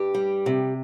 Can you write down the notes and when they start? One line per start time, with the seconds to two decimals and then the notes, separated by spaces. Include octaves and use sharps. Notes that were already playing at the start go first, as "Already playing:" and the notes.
Already playing: G2 G4
0.15 G3
0.46 C3